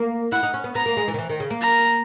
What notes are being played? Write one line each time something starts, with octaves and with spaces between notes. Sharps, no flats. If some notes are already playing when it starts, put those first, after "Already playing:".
Already playing: A#3
E4 F#5
D#4
C#4
B3
B3 A#5
A#3
G#3
E3
D#3
E3
D#3
C#3
A#3
A#5